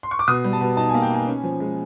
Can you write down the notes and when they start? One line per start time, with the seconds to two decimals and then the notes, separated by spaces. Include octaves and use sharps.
0.03 C6
0.11 C#6
0.19 D6
0.28 B2 D#6
0.44 G3
0.53 A5
0.61 B2
0.77 D#4 A5
0.89 A#3 G#5
1.02 G5
1.11 D#4 G#5
1.27 C#4
1.43 F3
1.60 G#3